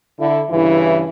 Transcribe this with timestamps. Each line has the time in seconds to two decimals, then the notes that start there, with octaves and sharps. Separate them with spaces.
0.19 D3 E4
0.50 G2 C#3 E3 E4